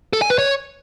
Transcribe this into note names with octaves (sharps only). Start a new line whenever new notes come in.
A4
G#5
B4
C#5